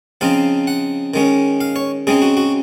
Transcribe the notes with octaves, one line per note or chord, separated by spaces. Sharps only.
C#3 F3 C4 D#4 F5
F#5
D#3 G#3 C#4
F5
C#5
C#3 G#3 C4 D#4 G#4
F#4
F#4